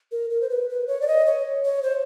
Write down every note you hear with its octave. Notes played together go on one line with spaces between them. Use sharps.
A#4
A#4
C5
B4
B4
C#5
D5
D#5
C#5
C#5
C5